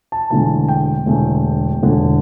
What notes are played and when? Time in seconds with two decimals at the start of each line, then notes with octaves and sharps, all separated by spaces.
0.12 A5
0.30 E1 E2 D3 A3 A5
0.68 G5
1.06 E1 E2 D3 A3
1.83 E1 E2 D3 A3